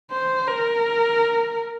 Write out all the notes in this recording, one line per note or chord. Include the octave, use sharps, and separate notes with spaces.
C5
A#4